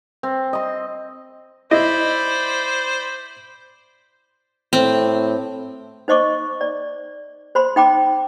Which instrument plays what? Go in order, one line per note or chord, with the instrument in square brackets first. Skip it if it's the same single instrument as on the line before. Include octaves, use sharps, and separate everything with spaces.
[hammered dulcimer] C4
D#5 C6
[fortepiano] E4 [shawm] C5 [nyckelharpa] D5 B5 [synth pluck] D#5
[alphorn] A2 [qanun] C4
[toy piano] D#4 C5 D#5 C#6 D6
D5
C5 B5 C6
D#4 G5 B5 D6